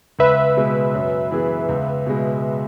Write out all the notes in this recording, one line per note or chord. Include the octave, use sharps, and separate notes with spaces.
C#2 B4 E5
B2 G#3
F#2
E3 B3 G#4
C#2
B2 G#3